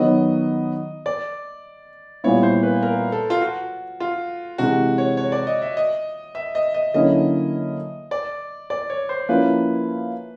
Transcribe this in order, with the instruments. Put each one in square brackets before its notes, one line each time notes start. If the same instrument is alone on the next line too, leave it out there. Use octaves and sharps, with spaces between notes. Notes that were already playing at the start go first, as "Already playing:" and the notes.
Already playing: [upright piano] D#3 F#3 B3 D#4 [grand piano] D#5
[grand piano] D5
[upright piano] A#2 G3 B3 E4 [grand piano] C#5
[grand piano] C5
B4
A#4
A4
F4
F#4
F4
[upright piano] C3 E3 G#3 [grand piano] F#4
[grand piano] C#5
C#5
D5
D#5
E5
D#5
E5
D#5
D#5
[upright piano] D3 F#3 A#3 C#4 E4 [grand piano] D#5
[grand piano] D5
D5
C#5
C5
[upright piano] F3 A#3 C#4 E4 [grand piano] B4